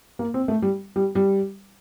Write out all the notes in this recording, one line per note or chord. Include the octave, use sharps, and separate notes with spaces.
A#3
C4
A3
G3
G3
G3